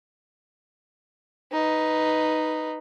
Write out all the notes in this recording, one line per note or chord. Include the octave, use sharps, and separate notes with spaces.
D#4 B4